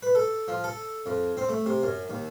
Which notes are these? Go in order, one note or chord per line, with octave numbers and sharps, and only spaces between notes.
B4
A4
F3
A4
F2
C4
A3
C3
F#2
D#2